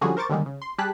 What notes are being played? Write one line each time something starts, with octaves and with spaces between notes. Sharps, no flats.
D3 F3 G3 C#4 F#4 G#4
A#4 C5 C#6 D6 A6
D#2 D3 D#3 G3 G#3
C#3
C6
G3 G4 G#4 A5 F#6 B6